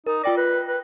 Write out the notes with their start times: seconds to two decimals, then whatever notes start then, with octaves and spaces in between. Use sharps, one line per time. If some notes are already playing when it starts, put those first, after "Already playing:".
0.06 D#4 A#4
0.24 F4 D5 G5 A#6
0.37 B4
0.68 B4